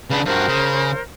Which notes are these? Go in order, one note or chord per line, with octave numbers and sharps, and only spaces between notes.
C#3 D4 B4 G#5
G2 F#4 A#4 C5
C#3